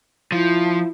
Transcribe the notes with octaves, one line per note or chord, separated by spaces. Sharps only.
F3 E4